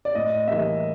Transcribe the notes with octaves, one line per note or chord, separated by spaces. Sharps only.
D5
A2 D#5
E3 G3 A#3 E5